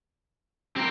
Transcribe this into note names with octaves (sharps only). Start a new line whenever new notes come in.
C4 G4 A#4